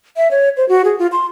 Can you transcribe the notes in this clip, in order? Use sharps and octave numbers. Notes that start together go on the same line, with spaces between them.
E5
C#5
C5
F#4
G#4
F4
C6